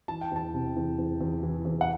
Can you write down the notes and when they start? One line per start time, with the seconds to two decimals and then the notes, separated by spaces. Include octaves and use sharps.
0.08 E3 A5
0.21 G5
0.32 E2 A5
0.54 C3
0.76 E2
0.98 E2
1.21 E2
1.43 E3
1.65 E2
1.81 F#5